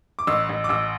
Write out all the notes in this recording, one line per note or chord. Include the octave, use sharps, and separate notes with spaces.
D6
A1 E6
A1
D6
A1 E6